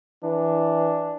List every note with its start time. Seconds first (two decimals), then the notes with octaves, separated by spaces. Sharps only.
0.24 E3 D4